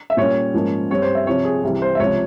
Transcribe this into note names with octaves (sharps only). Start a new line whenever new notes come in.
E5
A#2 G3 C#4 C#5
G#2 F3 A#3 C#4
G2 G3 C4 C#5
C5
E5
C3 F3 C4 C#5
G#4
C2 C3 E3 G3
C5
E5
C#2 C3 F3 C4 C#5